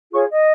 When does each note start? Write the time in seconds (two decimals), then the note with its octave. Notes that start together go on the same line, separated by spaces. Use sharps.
0.11 F4 G#4 C#5 C#6
0.28 D#5